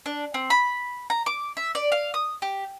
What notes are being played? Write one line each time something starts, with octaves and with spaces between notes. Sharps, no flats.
D4
C4
B5
A#5
D6
E5
D5
F5
D#6
G4